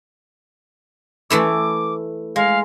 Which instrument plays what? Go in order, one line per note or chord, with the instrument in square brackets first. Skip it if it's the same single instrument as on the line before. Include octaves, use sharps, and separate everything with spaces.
[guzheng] E3 A3 E4 [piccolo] D6
[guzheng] G#3 [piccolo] F5